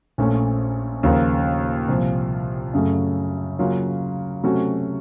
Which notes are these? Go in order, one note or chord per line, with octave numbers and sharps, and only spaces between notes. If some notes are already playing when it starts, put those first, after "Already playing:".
A#1 A#2 A3 C#4
D#2 C#3 F3 A#3 F4
C2 A#2 F3
F#2 C#3 F#3 A3
C#3 F#3 A#3 C#4 F4
C3 F#3 A3 C#4 F#4